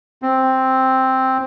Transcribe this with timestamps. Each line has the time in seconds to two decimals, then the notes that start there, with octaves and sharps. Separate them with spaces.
0.22 C4